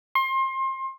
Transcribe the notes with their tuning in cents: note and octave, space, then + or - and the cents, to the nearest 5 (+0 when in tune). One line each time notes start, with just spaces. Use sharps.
C6 +30